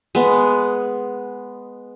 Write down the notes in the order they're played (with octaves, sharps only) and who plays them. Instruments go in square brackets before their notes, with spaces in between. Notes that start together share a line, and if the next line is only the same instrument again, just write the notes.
[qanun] G#3 B3